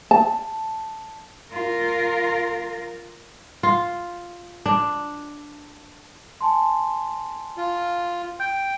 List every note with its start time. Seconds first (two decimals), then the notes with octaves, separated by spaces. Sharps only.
0.11 A5
1.51 F4 A#4
3.63 F4
4.66 D4
6.41 G#5 A5 C6
7.57 F4
8.40 G5 G6